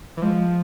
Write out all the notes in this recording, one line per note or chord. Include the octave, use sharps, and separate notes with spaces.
E3
F3 G#3